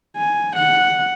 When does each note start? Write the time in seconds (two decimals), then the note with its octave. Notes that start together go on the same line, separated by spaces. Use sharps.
0.17 G#5
0.56 F#5